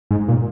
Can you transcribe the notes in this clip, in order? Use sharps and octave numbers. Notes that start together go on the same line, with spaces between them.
G#2
A#2